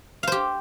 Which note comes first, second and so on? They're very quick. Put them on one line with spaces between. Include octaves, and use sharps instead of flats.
F5 C5 G4